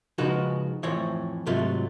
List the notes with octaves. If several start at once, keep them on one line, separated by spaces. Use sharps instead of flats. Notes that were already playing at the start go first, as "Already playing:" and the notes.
C#3 F3 G#3 D#4 F#4 B4
F2 A2 E3 C5 C#5
G#2 C3 F#3 A3 F4